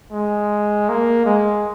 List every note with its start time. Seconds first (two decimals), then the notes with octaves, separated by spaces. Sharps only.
0.12 G#3
0.89 A#3
1.26 G#3